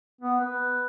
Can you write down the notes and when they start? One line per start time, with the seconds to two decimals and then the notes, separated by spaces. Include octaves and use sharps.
0.21 B3
0.40 B4